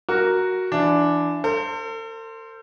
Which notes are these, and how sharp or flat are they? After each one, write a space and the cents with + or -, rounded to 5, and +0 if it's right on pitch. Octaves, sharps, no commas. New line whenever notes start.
F#4 +0 A#4 +0
E3 +30 D4 +0
A4 +45 C5 +0